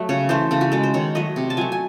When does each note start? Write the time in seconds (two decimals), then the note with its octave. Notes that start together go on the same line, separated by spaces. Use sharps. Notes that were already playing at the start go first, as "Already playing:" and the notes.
Already playing: F#3 A3
0.09 C#3 C#5
0.29 E3 A3 C5
0.51 C#3 A4
0.61 F#4
0.72 G#3 A4
0.83 C5
0.94 D#3 C#5
1.15 F#3 A3 D#5
1.36 C3
1.50 A5
1.57 F#3 A3 G#5
1.72 G#5